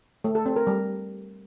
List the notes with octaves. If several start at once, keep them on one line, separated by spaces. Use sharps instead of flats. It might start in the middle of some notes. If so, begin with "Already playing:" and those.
A3
A4
C4
A#4
G3